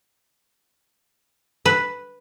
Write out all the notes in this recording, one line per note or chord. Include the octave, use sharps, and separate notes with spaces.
B4